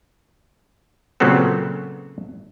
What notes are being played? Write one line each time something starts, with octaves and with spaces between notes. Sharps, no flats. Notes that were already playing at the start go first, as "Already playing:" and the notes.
A#2 C#3 F#3 B3 C4 A4